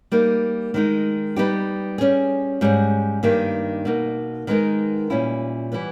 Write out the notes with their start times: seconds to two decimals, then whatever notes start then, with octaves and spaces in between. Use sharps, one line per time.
0.12 G3 A#3 D#4
0.74 D#3 G#3 D#4
1.36 G3 B3 D#4 G4
1.98 G3 C#4 G#4
2.61 G#2 G3 C#4 G#4
3.23 G2 D#3 A#3 D#4 G4
3.85 B2 A#3 D#4
4.47 D#3 G#3 B3 D#4 A#4
5.10 A#2 G3 C#4 E4
5.72 E3 G3 B3